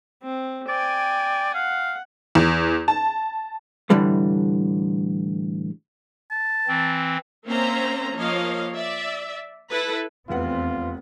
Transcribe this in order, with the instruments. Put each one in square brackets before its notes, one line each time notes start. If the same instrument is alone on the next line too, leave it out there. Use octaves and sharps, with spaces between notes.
[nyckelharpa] C4
[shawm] D5 [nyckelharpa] G5 G#5
[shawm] F5 [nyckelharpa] F#5
[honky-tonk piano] E2
A5
[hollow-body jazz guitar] A2 D3 E3 G3 A3
[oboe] A5
[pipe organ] E3 C4
[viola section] A#3 C4 C#4 C5 E5 A#5
F3 A#3 C#5 D#5 F5
D5 E5
E4 A4 B4
[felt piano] F1 B4 F#5 [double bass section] E2 C4 [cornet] F4